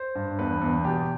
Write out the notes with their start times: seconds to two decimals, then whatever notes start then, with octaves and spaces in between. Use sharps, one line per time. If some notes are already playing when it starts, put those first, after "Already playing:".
Already playing: C5
0.15 G2
0.39 E2 B4
0.61 E2
0.84 B2 G4